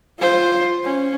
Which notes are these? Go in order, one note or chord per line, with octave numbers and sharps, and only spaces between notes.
F4 C5
C#4